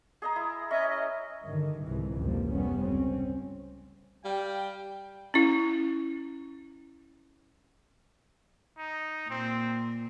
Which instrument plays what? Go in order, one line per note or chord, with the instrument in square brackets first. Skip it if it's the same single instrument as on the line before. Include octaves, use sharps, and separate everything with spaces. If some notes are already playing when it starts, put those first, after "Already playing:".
[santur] G#4 D#5 A#5
E4
[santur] C#4 [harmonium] D#5 E5
[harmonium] D#5
[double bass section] G2 D3 D#3
C2 G#2 E3
F1 C#2 C3 F3 G3 A#3
F1 G2 G3 B3 C#4
C#2 C4 C#4
[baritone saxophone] G3 [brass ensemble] F5 G5
[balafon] C#4 E4
[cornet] D#4
[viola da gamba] A#2 [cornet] C4